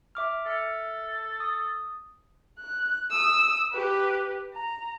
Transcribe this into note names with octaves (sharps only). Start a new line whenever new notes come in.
E5 D6 F6
A4 E5 F6 C#7
D#6
F#6
D#6 E6
G4 B4
A#5